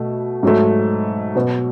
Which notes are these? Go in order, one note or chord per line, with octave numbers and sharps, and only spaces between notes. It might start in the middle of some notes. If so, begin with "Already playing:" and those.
Already playing: B2 A3
G#2 F#3 A3
B2 F#3 B3 F#4